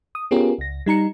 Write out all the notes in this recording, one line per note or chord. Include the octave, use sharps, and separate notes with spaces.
D#6
B3 C#4 F4 G4 G#4 A#4
C#2 A#6
G3 D#4 A#5 C#7